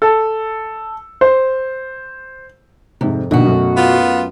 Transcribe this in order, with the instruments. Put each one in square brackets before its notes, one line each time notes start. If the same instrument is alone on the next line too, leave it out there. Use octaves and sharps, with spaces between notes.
[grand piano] A4
C5
[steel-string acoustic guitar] F2 [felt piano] G#2 C3
[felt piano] A#1 D3 D#3 [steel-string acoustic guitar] B2 F#4
[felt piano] F#2 A3
[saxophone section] B3 F4